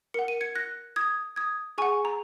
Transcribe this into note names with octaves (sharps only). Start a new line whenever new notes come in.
A#4 F#5 C#7
D#7
G#6 C#7
F#6 A#6
D#6 G#6
D#6 G#6
G#4 F#5 G#5 C#6
A#5